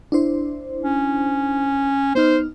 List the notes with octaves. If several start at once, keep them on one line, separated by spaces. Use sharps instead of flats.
D4 E4 C5
C#4
B3 D#4 C5 F6